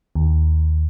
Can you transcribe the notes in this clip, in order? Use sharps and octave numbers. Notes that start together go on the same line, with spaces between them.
D#2